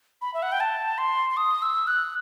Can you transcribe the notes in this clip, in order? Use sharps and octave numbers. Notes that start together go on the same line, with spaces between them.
B5
E5
F#5
G5
A5
C6
C6
D#6
E6
F#6